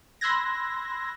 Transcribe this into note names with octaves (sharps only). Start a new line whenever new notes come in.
B5 C6 E6 F#6 G#6 A#6